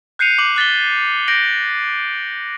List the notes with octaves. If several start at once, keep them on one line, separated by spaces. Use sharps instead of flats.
F#6 G6 C7 C#7 D#7 F7
D6 F#7
F#6 A6 B6 G7
G6 A#6 D7 F#7